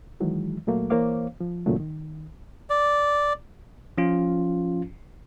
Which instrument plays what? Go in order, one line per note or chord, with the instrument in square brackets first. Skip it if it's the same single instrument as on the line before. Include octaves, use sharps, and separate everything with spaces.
[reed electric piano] D#3 E3 F#3 G#3
A#2 F#3 A3 A#3
E3 A#3 C5 C#5 F5 D6
F3
F#2 A#2 C#3 E3 F#3 A3
D#3
[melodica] D5
[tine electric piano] F3 C#4 F4